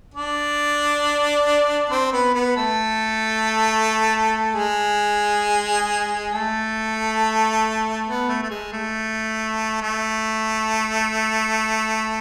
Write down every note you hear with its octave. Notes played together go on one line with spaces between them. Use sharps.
D4 D5
C4 C5
B3 B4
B3 B4
A3 A4
G#3 G#4
A3 A4
B3
A3
A3
G#3
A3
A3